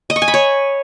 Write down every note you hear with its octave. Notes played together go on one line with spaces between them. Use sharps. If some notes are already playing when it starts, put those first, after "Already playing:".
D#5
C#6
G#5
B5
C#5